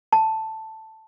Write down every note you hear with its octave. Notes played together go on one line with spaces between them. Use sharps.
A5